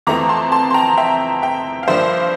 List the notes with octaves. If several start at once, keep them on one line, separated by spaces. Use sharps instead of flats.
F2 E3 A3 C4 A#5 D6
A5 C6
A5 C6
C6
G5 A#5
E5 G5
E5 G5
F5
G2 F3 A#3 D4 C5 E5